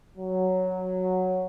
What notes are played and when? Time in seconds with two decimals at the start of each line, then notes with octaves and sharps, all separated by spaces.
0.18 F#3